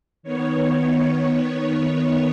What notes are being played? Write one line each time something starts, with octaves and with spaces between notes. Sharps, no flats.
D#3 B3 C#5